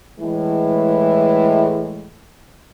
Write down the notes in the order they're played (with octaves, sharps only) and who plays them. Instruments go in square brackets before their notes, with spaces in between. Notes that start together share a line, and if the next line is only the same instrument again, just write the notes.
[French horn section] A2 E3 G#3